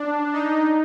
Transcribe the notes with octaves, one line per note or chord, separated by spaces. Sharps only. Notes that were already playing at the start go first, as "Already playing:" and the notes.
Already playing: D4
D#4